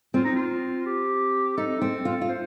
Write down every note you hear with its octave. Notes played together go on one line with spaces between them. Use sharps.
C4 F4
D#4
F4
G4
D#4 A4
C4
F4
F4
C5